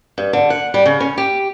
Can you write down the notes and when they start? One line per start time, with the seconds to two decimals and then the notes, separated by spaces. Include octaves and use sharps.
0.18 G2
0.33 D3
0.50 F#5
0.74 G3
0.85 C#3
1.00 C#4
1.18 G4